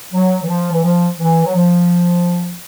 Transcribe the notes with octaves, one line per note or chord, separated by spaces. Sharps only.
F#3
E3
F3
E3
F3
E3
F#3
F3